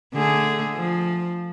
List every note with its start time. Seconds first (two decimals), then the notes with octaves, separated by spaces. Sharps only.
0.14 D3 A3 G#4
0.75 F3